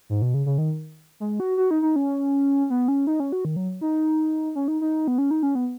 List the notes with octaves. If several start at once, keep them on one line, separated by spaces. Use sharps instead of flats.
G#2
B2
C#3
C#3
D#3
G#3
F#4
F#4
D#4
D#4
C#4
B3
C#4
D#4
C#4
F#4
D#3
F#3
D#4
C#4
D#4
D#4
B3
C#4
D#4
C#4
B3